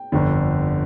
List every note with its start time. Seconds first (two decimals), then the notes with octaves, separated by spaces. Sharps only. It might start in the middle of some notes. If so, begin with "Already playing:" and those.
Already playing: G5
0.12 G1 F2 D3